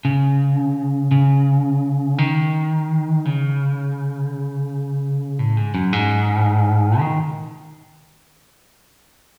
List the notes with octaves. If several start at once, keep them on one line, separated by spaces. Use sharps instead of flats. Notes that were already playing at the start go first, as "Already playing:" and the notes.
C#3
C#3
D#3
C#3
A2
G#2
F#2
G#2
D#3